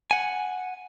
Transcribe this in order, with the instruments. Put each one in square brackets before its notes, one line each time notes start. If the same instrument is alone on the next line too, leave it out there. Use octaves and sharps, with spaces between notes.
[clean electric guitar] F#5 G#5